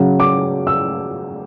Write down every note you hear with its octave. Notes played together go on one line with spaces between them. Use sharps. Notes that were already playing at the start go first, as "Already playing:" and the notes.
Already playing: C#3 F#3
D6
E6